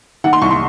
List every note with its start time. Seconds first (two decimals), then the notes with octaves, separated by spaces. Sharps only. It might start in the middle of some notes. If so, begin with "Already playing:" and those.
0.24 D#3 F#5
0.33 C6
0.42 C2 C#6
0.51 C6